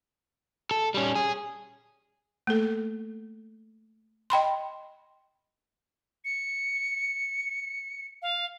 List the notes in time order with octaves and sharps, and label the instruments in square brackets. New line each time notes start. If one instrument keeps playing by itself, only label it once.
[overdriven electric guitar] A4
G3 C#4
G#4
[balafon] A3 A#3 A4
D#5 G5 B5 C6
[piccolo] C#7
F5